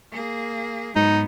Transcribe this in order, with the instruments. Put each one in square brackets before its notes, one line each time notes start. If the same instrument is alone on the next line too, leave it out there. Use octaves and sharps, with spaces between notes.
[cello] A#3 G#4
[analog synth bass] G#2 [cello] F#3 B3 [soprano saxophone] D#4